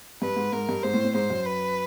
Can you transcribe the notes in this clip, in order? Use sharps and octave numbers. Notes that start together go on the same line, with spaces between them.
G2 B4
G#2
G#2 A#4
G2
G#2 C5
A2
A2
G#2 C5
F#2
B4